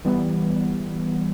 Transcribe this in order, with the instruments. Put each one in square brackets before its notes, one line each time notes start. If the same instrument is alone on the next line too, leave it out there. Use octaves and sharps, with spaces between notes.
[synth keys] E3 G3 B3